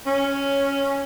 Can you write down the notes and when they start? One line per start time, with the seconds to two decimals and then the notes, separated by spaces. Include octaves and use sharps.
0.06 C#4